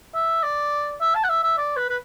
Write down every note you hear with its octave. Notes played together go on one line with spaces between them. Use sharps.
E5
D5
E5
A5
F#5
E5
E5
D5
B4
B4